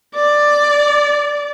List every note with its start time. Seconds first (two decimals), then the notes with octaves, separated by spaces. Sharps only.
0.15 D5